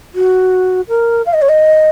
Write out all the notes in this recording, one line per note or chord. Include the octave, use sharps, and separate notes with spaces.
F#4
A#4
F5
D#5
C#5
D#5